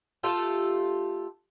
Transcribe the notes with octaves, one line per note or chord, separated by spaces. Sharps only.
A3 F4 G4 A4